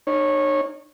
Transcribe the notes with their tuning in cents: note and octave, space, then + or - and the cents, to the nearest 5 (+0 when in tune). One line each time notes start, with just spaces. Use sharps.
D#4 -45 C#5 -20